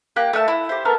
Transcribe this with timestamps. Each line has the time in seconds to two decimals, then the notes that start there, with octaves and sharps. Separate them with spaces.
0.16 A#3 G4 G5 F#6
0.33 A3 E5 F#5 A5
0.48 E4
0.69 G4 C5
0.85 A3 B3 A4 A#4